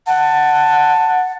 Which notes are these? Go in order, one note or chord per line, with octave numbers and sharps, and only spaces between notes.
F#5 A5